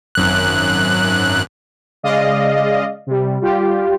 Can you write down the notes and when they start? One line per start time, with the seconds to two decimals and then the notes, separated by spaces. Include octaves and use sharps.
0.15 G#1 F#2 F#6
2.03 C#3 G#3 D5 D#5 F5
3.06 C3 G3
3.41 G3 F4 G4